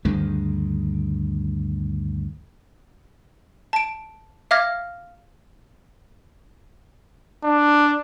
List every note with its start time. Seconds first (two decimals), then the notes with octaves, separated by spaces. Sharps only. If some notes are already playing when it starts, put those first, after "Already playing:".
0.05 D2 G2 D#3 G#3
3.73 A5 D7
4.51 E5 F5 D6 F6 G#6 A#6
7.44 D4